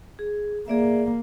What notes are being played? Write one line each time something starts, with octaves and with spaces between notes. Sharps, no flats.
G#4
A#3 G#4 D5 E5